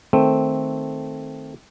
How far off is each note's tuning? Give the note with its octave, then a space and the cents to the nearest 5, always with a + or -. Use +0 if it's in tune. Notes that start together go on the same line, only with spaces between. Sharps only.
D#3 +0 A3 +0 C4 +0